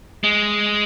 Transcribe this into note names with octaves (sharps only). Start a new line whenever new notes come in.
G#3